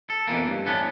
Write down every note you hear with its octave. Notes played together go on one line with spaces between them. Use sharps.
A4
F2 B2 E3 A#3
G2
A2 B3 C#4 D4